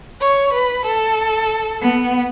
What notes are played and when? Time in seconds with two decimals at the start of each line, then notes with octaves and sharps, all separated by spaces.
0.21 C#5
0.53 B4
0.85 A4
1.81 B3